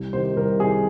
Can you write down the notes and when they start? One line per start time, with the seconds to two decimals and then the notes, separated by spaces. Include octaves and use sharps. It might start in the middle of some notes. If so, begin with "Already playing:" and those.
Already playing: C2
0.13 C3 D#3 C5
0.36 C2 A#4
0.60 C3 G#4
0.63 D#3